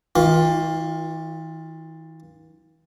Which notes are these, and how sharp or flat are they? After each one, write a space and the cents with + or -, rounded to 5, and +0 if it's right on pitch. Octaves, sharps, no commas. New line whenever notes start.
E3 -45 F4 +10